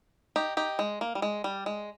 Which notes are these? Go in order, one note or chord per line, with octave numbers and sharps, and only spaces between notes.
D#4 G4
D#4 G4
G#3
A#3
G3
G#3
G3
G#3